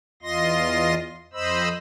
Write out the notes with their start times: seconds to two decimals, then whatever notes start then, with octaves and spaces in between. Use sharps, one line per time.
0.22 E2 F4 D#5 C6 A#6
1.33 F2 C5 D#5 B5 E6